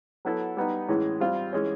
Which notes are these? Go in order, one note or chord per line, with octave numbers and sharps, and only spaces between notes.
F#3 B3 E4 A4
G3 B3 D#4
A2 E3 G#3 C#4
G3 C4 F4
E3 G#3 C#4